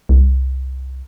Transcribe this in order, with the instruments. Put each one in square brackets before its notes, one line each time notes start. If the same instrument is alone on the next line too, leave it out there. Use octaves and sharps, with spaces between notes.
[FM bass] C2